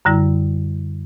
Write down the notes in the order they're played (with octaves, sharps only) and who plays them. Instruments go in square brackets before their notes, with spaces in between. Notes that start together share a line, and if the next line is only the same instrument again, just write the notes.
[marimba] F#2 D3 G3 E4